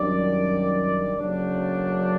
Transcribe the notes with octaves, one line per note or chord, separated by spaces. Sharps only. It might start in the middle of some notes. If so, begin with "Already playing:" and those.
Already playing: F#2 D#3 G3 D4 D5
F#1 F#2 C#3 F#3 A3 D4 D5